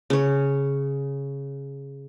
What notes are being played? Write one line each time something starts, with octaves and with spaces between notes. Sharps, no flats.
C#3 C#5